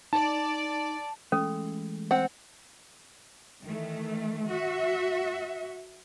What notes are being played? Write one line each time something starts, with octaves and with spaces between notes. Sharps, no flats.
D#4 D5 A5
E3 G#3 A3 C#4 A4
C4 F#5
D#3 E3 A3
F#4 E5